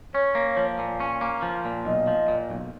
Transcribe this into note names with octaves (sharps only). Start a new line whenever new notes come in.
C#4 C#5
A#3
F3
A#2
C#4
A#3
F3
A#2
B1 D#5
F3
A#2
B1